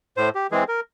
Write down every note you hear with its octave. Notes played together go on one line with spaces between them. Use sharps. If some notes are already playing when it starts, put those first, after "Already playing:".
A2 C5
G4
E3 G#3 C4 G#4
A#4